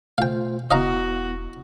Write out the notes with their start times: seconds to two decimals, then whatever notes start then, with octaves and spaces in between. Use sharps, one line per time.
0.18 B2 A3 F4 C5 F5 G5
0.71 E1 B3 E4 F#4 D#5 F5 A#5